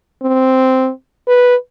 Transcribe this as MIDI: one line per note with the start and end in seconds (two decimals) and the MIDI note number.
0.23 0.90 60
1.28 1.56 71